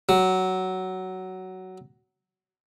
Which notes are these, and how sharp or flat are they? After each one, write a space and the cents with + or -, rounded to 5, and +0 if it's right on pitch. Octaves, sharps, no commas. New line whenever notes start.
F#3 +10